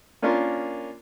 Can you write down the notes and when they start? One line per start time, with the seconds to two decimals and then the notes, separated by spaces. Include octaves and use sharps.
0.22 A#3 C#4 D4 F4 A#4